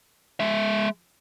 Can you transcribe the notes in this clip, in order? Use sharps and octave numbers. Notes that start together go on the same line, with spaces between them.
G#3 E5